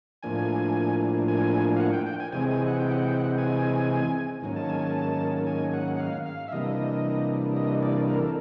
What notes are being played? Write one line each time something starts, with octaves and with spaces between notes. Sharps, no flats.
A2 F3 A#3 D4 G#5
G#5
F5
F#5
G5
G5
G#5
C3 E3 G#3 C4 G#5
G#5
F#5
G5
F#5
G5
F#5
G#5
G#2 D#3 F#3 A#3 C#4
A5
G#5
A5
G#5
F#5
F#5
F5
F5
E5
C3 E3 G3 A#3 D4 D#5
D#5
D5
A#4
A4